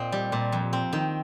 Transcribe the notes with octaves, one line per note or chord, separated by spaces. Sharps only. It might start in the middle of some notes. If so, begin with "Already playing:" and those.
Already playing: A#2 C4 D#5 G5
G3
A#2
F2
C4
D#3